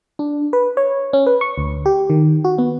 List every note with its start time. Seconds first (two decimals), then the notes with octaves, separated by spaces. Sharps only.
0.19 D4
0.53 B4
0.77 C#5
1.13 C#4
1.26 B4
1.41 C#6
1.58 D2
1.86 G4
2.10 D#3
2.44 F#4
2.58 B3